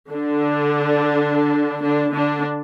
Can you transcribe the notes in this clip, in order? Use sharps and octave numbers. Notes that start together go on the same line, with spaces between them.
D3 D4
D3 D4
D3 D4